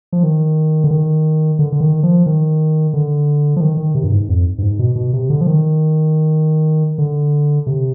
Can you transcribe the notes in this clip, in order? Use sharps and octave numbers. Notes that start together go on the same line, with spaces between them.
F3
D#3
D3
D#3
D3
D3
D#3
F3
D#3
D3
F3
D#3
D#3
C3
G2
G#2
F2
G2
G#2
B2
B2
C3
D3
F3
D#3
D3
C3